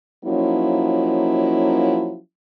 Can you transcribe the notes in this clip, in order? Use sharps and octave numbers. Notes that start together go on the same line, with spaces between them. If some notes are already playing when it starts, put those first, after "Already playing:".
F3 F#3 A#3 C#4 D#4 E4